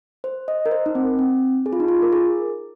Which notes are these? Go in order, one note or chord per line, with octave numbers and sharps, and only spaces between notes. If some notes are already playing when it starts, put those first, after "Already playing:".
C5
D#5
A#4
C5
D#4
C4
C4
G#4
F4
D#4
F4
A#4
G#4